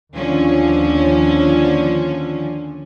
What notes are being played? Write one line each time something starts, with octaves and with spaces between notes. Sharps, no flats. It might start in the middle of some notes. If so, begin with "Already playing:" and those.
D#2 D3 F3 C#4